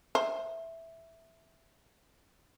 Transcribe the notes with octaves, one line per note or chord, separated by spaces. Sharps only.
C5 E5